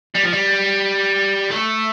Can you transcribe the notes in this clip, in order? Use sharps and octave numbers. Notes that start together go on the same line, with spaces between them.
G3
F3
G3
A3